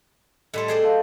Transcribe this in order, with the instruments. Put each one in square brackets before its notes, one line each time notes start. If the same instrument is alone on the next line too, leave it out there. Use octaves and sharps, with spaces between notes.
[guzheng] A2 G3 A4 [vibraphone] D#5 C6
[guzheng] G#4 C5 D5 [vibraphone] D#5
[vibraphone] D#5 F5 A5